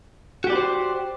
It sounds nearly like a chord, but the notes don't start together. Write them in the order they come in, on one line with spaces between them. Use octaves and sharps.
F#4 G4 D5 B4 C5